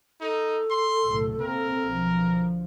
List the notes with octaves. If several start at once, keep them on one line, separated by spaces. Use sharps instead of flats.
D#4 A4
C6
F#1 B1 A2
C3 A#3 C4 A#4
B1 D3 F3